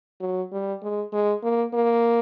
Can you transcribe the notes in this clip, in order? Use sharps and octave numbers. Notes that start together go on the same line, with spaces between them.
F#3
G3
G#3
G#3
A#3
A#3